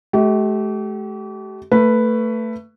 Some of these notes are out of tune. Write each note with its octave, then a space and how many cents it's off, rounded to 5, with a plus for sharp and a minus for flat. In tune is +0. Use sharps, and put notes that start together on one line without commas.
A3 -45 G4 -40
A3 +25 B4 +0